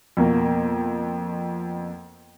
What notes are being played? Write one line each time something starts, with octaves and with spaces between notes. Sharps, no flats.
F2 B2 A#3